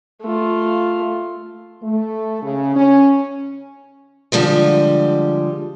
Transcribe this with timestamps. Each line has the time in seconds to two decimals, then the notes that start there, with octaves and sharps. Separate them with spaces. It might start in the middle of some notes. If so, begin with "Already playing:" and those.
0.22 A3 F4
1.83 A3
2.43 C#3
2.76 C#4
4.32 D3 F3 G3 G#3